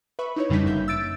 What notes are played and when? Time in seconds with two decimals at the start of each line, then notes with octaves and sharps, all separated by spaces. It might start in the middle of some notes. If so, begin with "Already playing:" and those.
0.19 B4 E5 B5 C#6
0.36 D#4 E4 C#5
0.49 F2 C#3 G3 D4 D#4 B6
0.64 G1 F#2 A#3 E5 G6
0.88 E6 A6 D7